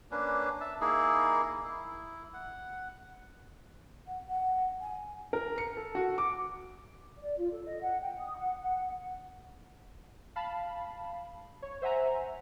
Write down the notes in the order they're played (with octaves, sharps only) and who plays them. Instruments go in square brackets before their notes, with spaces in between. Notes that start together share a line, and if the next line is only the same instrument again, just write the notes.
[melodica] A#3 C#4 D4 B4
E5 A5
A#3 D#4 E4 G#4
E4
F#5
[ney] F#5
F#5
G#5
[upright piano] A#4
C#7
A4
F#4
D6
[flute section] D5
F4
A4
D#5
F#5
G5
D#6
F#5
F#5
[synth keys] F5 A5 B5
C#5
C5 E5 F#5 G#5 A#5